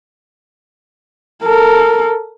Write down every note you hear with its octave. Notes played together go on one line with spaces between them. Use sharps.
A4 A#4